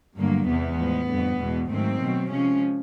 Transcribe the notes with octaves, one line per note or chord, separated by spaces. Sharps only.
G2 D3 F#3 A3 A#3
E2 C3 E3 G#3 B3
A2 F3 G#3
F2 D3 G3
E2 B2 G#3
G#2 D#3 F#3 A3 C4
B2 F#3 A3
C3 F3 G#3 C#4